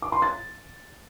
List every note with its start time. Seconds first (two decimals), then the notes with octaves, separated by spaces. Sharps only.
0.02 D6
0.12 C6
0.22 A6